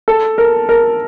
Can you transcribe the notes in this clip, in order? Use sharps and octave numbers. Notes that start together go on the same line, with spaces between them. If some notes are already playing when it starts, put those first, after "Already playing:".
A4
A#4
A#4